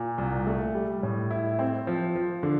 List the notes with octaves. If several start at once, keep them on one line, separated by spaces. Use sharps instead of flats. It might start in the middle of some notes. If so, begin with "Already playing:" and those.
Already playing: A#2
C2
A3
G3
A2
E4
C4
F3
F3
D3